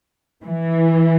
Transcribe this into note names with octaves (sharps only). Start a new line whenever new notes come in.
E3